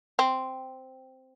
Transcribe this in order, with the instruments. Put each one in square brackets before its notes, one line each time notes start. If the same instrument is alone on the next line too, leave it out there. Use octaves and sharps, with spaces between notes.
[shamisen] C4